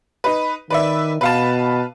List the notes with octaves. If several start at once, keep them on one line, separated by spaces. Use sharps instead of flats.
D#4 B4
D#3 B4 D5 E5
B2 B4 F5 A5